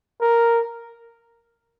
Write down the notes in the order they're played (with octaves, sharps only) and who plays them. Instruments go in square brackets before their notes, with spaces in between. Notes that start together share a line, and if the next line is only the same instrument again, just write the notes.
[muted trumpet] A#4